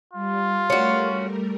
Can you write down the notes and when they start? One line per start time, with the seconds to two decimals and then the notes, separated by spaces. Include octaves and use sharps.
0.13 G3 F4
0.70 G3 A3 C#4 F#4 A#4